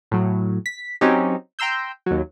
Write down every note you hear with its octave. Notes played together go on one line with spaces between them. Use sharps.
A2 F#3
B6
F#3 C4 C#4 D#4 G4
G5 A#5 C6 E6 G6
D#2 F#3